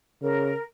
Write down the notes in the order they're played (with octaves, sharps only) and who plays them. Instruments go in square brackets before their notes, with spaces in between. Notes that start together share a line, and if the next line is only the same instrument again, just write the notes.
[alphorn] C#3 [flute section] A#4